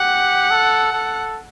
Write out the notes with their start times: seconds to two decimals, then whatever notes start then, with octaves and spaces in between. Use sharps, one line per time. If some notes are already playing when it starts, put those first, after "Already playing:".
Already playing: G4 F#5
0.51 A4
0.93 A4